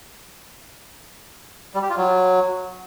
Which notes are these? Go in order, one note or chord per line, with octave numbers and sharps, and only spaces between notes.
G3
G4
F4
F#3